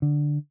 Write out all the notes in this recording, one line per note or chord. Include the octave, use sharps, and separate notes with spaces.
D3